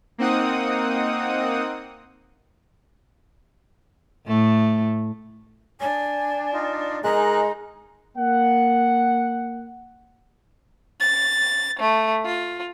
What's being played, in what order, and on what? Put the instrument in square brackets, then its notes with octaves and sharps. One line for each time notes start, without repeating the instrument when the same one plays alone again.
[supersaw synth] A#3 C4 D#4 F#5 D#6
[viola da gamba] A2 A3
[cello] D4 [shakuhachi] G#5
[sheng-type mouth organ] D#4 F4
[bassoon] G#3 [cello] D#4 [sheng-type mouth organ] G#4 A#4 F#6 [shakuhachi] A#5
[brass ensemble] A#3 F#5
[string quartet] A6
A3
F4